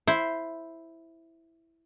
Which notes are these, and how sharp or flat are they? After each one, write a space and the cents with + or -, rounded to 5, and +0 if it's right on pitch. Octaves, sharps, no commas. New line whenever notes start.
E4 +0 C5 +0